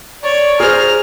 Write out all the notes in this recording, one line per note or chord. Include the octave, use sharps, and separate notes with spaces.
C#5 D5
G#4 C5 A#5 F6